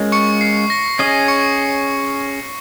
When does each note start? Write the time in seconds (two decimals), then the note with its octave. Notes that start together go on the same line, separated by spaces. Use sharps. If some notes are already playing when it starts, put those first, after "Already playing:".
Already playing: G#3 C#4 F4 A#4
0.12 C#6 C#7
0.41 C7
0.70 A#6
0.99 C#4 G#4 D#5 C7
1.28 C#6 C#7